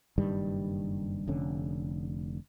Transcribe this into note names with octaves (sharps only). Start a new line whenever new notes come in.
F#1 G2 D#3 G3
F1 D3 C#4